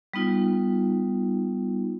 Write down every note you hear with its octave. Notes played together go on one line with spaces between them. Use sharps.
G3 B3 D#4 F4